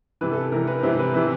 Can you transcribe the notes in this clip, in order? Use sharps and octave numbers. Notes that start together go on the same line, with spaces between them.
C3 E3 B4
A4
C3 E3 A#4
B4
C3 E3 C5
B4
C3 E3